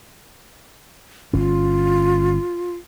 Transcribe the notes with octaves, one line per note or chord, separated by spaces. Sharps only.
G1 C#4 F4